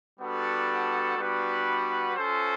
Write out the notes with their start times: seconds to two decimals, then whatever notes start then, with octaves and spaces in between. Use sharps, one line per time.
0.20 G3 B3 D4 F#4 A4
1.18 G3 B3 D4 F#4 B4
2.15 C#4 F4 A4 C5